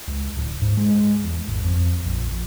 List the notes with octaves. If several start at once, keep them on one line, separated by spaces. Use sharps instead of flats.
C#2
D1
G#2
G#3
E2
G#1
F2
A#1
A#1